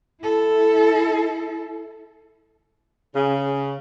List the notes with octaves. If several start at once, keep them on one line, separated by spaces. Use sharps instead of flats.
E4 A4
C#3